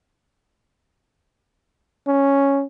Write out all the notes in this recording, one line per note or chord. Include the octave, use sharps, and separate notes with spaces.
C#4